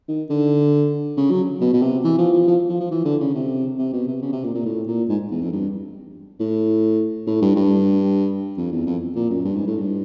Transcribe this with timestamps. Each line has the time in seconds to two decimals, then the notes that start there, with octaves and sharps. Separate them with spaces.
0.08 D#3
0.30 D3
1.17 C#3
1.31 F#3
1.61 B2
1.73 B2
1.82 C3
2.04 E3
2.18 F3
2.33 F3
2.47 F3
2.70 F3
2.80 F3
2.91 E3
3.05 D3
3.20 C#3
3.35 C3
3.78 C3
3.93 B2
4.07 C3
4.22 C#3
4.33 C3
4.44 A#2
4.55 A#2
4.66 A2
4.87 A#2
5.09 G#2
5.31 E2
5.42 F2
5.52 G2
6.40 A2
7.27 A2
7.42 G2
7.56 G2
8.58 F2
8.72 E2
8.87 F2
9.16 A#2
9.30 F#2
9.45 G2
9.56 G#2
9.67 A2
9.78 G2